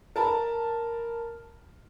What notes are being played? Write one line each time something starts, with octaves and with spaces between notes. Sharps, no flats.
A#4 A5 B5